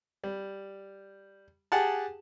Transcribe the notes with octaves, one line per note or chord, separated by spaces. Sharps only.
G3
G4 G#4 F#5 G#5 A5